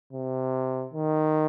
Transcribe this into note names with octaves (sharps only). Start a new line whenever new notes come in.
C3
D#3